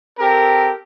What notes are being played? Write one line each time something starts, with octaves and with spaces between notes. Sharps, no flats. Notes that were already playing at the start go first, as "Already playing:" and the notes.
C4 G4 A4 A#4